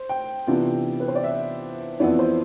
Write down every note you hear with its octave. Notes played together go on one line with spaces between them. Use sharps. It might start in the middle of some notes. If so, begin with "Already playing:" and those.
Already playing: C5
G5
C3 E3 B3 D4 F4
B4
C5
D5
E5
F2 E3 B3 E4 D5
C5